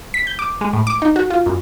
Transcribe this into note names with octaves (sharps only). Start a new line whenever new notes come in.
B6
G6
D6
G#3
A2
D6
D#4
F#4
F4
F#2